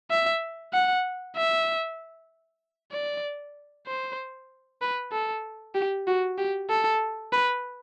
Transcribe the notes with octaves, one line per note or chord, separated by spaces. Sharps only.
E5
F#5
E5
D5
C5
B4
A4
G4
F#4
G4
A4
B4